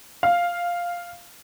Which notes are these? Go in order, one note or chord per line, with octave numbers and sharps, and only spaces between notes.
F5